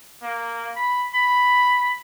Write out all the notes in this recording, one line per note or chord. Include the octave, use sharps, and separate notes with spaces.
A#3
B5
B5